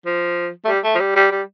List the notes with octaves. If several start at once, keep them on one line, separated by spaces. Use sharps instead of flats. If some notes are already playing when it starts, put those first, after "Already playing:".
F3
A3
G3
A3
F3
G3
G3
G3